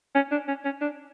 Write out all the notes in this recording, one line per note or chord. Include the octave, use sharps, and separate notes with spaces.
C#4
D4
C#4
C#4
D4